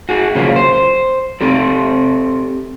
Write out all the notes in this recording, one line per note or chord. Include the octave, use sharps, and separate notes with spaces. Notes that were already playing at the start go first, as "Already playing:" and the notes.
F#4 G#4
C#3 F3 F#3 A#3
C5
C4 G4 A4